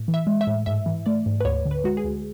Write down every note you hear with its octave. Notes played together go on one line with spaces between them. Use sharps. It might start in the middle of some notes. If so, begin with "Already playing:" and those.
Already playing: A2
E3
E5
G#3
E5
A2
G#2 E5
E3
A3 D5
G#2
B4
D2 C#5
D3
B4
G#3 F#4
G#4
D2